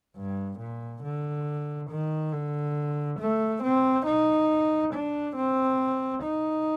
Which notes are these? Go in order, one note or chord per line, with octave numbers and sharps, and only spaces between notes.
G2
A#2
D3
D#3
D3
A3
C4
D#4
D4
C4
D#4